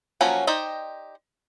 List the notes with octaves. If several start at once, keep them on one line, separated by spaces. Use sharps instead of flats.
F3 F#3 A#3 C#4 F#4
D#4 G4 C5 D5 D#5